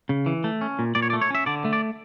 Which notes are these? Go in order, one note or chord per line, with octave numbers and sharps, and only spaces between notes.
C#3
E3
A3
C#4
A#2
A#2 D5
C#5
D5
A3
C#5
C#4 E5
D3 D5
A3
D5